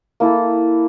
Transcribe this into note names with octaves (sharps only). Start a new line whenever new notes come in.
A#3 E4 A4